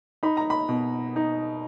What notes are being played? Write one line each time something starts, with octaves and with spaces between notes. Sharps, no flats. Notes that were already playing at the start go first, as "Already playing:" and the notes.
D#4 B5
A#5
B5
B2
D#4